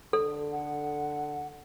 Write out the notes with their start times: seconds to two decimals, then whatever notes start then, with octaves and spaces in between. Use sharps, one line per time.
0.13 D3 A4
0.51 F#5